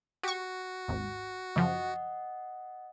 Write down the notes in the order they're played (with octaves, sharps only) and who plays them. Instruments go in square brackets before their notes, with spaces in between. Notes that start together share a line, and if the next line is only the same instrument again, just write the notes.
[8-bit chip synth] F#4 [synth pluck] G4 C#6
[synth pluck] G#1 D#2
[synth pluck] F#2 C#3 F3 [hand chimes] D#5 F#5